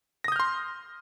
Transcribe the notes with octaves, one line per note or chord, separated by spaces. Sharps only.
C6 D#6 F6 G6 A#6